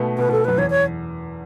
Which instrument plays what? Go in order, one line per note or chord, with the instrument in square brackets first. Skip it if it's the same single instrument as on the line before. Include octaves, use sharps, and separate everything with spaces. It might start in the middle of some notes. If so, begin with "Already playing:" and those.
Already playing: [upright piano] B2 A3 B3
[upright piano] B2 B3 [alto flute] B4
[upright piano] B2 B3 [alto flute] A4
[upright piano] F#2 F#3 [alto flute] B4
[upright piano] E2 E3 [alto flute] C#5
[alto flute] C#5